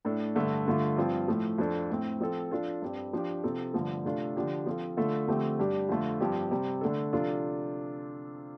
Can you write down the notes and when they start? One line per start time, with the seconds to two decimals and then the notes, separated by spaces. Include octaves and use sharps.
0.05 A2 A3 D4 A4
0.36 G2 D3 A3
0.66 G2 D3 A3 F4
0.97 G2 F3 C4 F4
1.28 A2 F3 A3
1.58 F2 F3 D4 A4
1.90 A2 A3 C4
2.21 F3 C4 A4
2.51 F3 D4 F4 A4
2.82 G2 G3 C4
3.13 F3 D4 G4
3.44 C3 F3 C4 A4
3.74 G2 D3 F3 A3
4.05 C3 A3 D4 F4 A4
4.36 D3 F3 D4 G4
4.66 F3 C4 F4 A4
4.97 D3 A3 F4 A4
5.28 D3 F3 A3 C4 G4
5.59 G2 G3 D4 G4
5.89 F2 D3 A3 F4
6.21 G2 F3 C4 G4
6.51 C3 G3 C4
6.81 D3 A3 D4 A4
7.13 C3 F3 D4 F4 A4